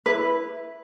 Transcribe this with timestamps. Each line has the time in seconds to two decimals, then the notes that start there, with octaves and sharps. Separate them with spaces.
0.06 E4 B4